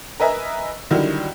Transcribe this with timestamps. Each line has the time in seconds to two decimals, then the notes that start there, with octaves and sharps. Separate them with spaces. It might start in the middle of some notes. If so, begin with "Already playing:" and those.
0.20 A#4 B4 D#5 E5 G#5 A#5
0.91 D3 D#3 F#3 G3 E4